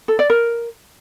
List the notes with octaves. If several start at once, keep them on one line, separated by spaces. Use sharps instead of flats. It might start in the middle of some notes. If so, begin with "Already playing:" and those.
A4
D5
A#4